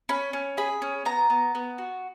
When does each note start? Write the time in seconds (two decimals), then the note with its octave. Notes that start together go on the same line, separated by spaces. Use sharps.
0.09 C#4 B5
0.33 C#4
0.57 G#4 B5
0.82 C#4
1.05 B3 A#5
1.30 B3
1.55 B3
1.78 F#4